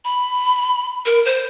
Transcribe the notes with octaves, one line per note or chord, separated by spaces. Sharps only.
B5
A#4
C5